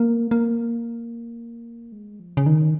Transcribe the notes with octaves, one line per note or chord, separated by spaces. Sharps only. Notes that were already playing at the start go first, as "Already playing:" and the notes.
Already playing: A#3
A#3
G#3
F3
C#3
D#3